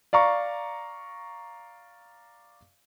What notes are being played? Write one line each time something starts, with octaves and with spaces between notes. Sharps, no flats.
D5 F5 A#5 C#6